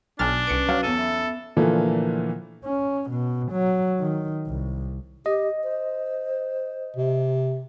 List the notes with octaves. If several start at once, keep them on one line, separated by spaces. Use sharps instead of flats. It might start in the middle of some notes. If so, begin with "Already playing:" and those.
B1 D4 G#5 A5 F6 A6
C2 C#4 B4 C#7 D7
F#3 F5
E2 C#4 A4 D#7
B3 E5
A#2 D3 E3 F3 A3 A#3
C#4
B2
F#3
D#3
C2
G4 D#5
C5
C3